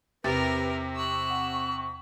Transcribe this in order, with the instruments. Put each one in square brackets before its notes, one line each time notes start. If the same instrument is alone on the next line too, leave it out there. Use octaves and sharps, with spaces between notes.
[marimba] E2 C4 A6 [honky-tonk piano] C3 [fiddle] A#4 [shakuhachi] B4
[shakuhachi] C#6 [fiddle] E6 F#6
[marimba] F#5